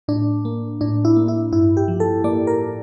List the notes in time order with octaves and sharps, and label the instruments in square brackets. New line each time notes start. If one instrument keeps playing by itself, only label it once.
[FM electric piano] A2 D4
A#3
A2 D4
E4
A#3
E4
G2 E4
G4
F3
A4
A#3 D5
A#4